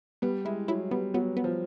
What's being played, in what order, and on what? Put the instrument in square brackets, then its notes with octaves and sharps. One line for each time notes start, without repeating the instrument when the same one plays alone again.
[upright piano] G3 [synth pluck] B3
[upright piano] G#3 [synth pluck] E4
[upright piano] F#3 [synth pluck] E4
[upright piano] G3 [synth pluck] B3
[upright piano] F#3 [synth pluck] B3
[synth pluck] B3
[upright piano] F3